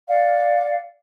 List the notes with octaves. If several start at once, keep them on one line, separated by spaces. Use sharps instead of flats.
D5 F5 F#5